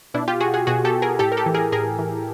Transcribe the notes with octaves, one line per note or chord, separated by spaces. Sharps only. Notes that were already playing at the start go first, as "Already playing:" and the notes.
B2 D4 E4
F4 G4
F#4 G#4
F#4 G#4
B2 F#4 G#4
G4 A4
G#4 A#4
A2 G4 A4
A#4
G4 A4
E3
G#4 A#4
A2 G#4 A#4
E3